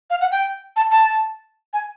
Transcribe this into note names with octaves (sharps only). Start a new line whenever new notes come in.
F5
F#5
G5
A5
A5
G#5